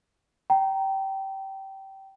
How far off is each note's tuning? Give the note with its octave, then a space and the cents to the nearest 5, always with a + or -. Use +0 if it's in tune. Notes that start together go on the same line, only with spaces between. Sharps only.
G5 -20 A#5 +0